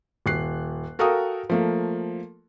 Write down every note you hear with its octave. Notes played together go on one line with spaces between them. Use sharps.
D#1 F#6 C7
F#4 A4 A#4 F5 G5 D#6
F3 A3 A#3